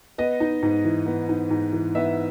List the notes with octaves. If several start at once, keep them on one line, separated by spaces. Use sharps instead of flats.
B3 D#5
D#4
G#2
E3
B3
D#4
G#2
E3
B3 E5